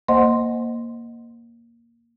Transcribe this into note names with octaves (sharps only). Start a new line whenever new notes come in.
A#3 C5 D#5 F#5 C6